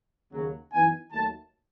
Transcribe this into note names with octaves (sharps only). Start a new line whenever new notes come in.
D#2 C#3 F#3
F#2 E3 B3 D#4 G#5
D#2 D#3 F#3 A3 A5